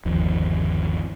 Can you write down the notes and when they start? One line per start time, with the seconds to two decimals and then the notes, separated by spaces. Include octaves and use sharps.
0.05 G1 D#2 F3